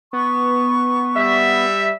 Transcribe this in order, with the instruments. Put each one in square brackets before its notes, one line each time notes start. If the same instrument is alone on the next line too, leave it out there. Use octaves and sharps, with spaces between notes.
[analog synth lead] B3 [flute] C#6
[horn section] G3 E5